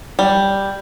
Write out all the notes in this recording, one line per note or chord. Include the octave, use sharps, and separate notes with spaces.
G3